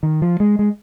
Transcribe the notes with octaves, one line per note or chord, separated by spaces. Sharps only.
D#3
F3
G#3
G#3